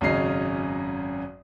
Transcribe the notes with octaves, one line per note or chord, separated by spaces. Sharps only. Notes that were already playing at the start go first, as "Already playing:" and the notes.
G#1 F#2 C#3 C#4 D#5 C7